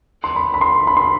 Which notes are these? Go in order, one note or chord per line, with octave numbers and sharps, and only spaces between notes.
C6
B5
B5
C6
B5
C6